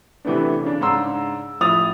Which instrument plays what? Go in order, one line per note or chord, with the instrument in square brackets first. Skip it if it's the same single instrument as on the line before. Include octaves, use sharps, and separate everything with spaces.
[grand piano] C3 E3 A3 B3 D4
C#3 D4
G#2 C#3 D4 A#5 C6 E6
A1 F3 E4 D#6 A6 F7